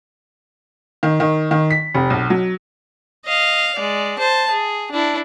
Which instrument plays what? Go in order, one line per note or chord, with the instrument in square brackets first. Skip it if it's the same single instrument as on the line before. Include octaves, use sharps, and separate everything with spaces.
[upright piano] D#3
D#3
D#3
B6
F1
B1
F#3
[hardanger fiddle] D#5 F5
G#3 D5
C5 A5
G#4
D4 E4